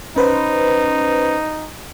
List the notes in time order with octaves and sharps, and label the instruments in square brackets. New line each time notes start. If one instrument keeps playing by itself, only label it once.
[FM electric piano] C#4 B4 C5 [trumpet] D#4